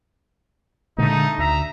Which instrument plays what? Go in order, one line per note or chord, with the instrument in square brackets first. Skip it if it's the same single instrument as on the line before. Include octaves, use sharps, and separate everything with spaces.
[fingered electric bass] A#2 D3 G#3 [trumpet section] A3 D#4
[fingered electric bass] D2 [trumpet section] E5 A#5